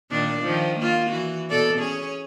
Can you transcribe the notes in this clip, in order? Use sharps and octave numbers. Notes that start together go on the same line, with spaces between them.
A#2 D#3 D4
D#3 F3
A#3 F4
E3 F#4
B2 A4 D5
C#4 G#4 C#5